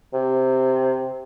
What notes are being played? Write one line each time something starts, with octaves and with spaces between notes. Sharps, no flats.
C3